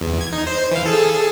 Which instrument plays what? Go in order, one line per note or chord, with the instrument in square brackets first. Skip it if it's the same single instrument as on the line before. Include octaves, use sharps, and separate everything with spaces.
[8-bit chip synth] E2
G#6
D#4
C5
E3 F5
G#4 A4